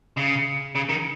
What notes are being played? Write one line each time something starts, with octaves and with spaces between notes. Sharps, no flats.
C#3
C#3
D#3